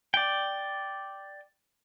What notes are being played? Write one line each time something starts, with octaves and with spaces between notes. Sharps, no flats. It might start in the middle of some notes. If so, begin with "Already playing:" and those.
D5 G5